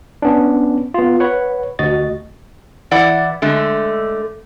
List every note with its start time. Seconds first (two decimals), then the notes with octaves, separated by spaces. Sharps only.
0.22 B3 C#4 D4
0.94 B3 F4
1.20 B4 C#5 F#5
1.79 D2 F#4 D#5 A6
2.91 E3 E4 D5 F#5
3.42 D3 G#3 A3